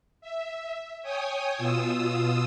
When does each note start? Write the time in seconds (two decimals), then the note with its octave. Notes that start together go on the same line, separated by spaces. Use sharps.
0.21 E5
1.02 C#5 G5 G#5 D#6
1.56 B2 F4 D#6 E6